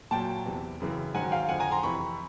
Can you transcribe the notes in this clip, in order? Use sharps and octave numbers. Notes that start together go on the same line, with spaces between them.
A#2 F#3 G5 A5
E2 C3 E3
F#2 C#3 E3
G#2 D#3 F#3 F#5 G#5
F5 G5
F2 D3 F3 F#5 G#5
G#5 A#5
A#5 C6
F2 C3 E3 B5 C#6